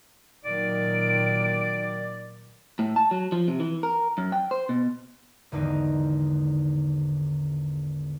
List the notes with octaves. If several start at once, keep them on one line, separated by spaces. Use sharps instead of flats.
A#2 D#3 F#3 D5 D7
A2
A5
F#3
F3
C3
E3
A#4
F#2
G5
C5
B2
G#1 E2 D3 D#4